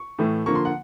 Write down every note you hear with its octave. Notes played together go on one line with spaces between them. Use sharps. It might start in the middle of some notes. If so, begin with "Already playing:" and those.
Already playing: C#6
A2 E3 A3
D3 F3 A#3 C#6
C6
F#5